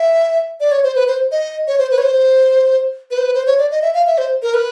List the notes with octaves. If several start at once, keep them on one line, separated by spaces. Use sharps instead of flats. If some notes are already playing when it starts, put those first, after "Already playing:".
Already playing: E5
D5
C#5
C5
B4
C5
D#5
C#5
C5
B4
C#5
C5
B4
C5
B4
C5
C#5
D5
D#5
E5
F5
E5
C5
A#4
B4